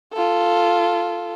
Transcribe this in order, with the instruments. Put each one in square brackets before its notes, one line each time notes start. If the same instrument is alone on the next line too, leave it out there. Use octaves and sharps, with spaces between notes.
[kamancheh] F4 A4